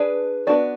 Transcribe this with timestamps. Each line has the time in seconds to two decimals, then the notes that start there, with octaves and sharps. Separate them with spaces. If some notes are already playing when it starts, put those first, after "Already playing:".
Already playing: D4 G#4 B4 D5
0.47 B3 D4 F#4 D5